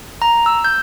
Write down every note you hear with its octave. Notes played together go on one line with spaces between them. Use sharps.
A#5
E6
G6